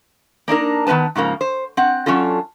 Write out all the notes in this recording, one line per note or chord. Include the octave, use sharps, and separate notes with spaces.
A#3 D4 D#4 A#4
D#3 B3 C#4 B4 A5
G#2 C#3 F3 A#3
C5
C4 F#5
F#3 C#4 D4 F4 A4